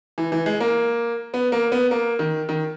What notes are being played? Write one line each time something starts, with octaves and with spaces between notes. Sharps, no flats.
E3
E3
G#3
A#3
B3
A#3
B3
A#3
D#3
D#3